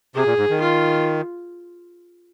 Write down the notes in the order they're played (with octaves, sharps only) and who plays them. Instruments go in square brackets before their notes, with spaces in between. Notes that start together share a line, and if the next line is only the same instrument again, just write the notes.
[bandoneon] C3 [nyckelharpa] G#4
[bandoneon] A#2
G#2
D#3
[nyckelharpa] F4